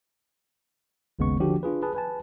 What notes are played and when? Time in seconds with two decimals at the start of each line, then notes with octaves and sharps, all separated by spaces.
1.19 G#1 D#2 C#3 G#3 B3 C#6
1.40 D3 F3 D4 F#4 G4
1.63 D4 F4 G#4 B4
1.83 G#4 B4 A5
1.95 B4 G#5 A5